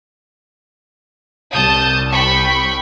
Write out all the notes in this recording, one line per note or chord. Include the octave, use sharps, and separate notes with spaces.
C2 A5 D#6 G6
G5 B5 C#6